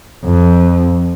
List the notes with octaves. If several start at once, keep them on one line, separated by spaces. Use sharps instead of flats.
F2